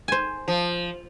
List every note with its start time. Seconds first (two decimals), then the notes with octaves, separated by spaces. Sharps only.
0.08 C5 G#5
0.48 F3